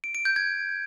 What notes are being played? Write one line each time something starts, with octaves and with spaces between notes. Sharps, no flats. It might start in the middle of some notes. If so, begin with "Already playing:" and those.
D7
D7
G6
G#6